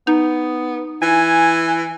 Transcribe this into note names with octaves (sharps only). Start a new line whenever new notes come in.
B3 D#4
E3 G#5